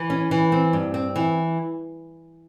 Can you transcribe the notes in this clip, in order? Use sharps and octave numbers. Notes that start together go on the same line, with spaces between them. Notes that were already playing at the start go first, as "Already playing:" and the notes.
Already playing: E3
C#4
E3
C4
G2
C4
E3